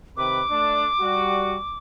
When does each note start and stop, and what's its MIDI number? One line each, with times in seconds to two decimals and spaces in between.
0.17 0.40 48
0.17 0.40 51
0.17 0.40 71
0.17 1.78 86
0.50 0.86 57
0.50 0.86 62
1.00 1.55 55
1.00 1.55 66